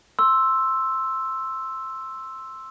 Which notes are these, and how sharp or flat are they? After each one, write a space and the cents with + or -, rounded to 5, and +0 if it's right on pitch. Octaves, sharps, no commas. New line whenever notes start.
C6 +10 E6 +0